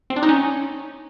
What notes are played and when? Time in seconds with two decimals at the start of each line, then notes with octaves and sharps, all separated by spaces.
0.10 C4
0.16 D4
0.23 D#4
0.29 C#4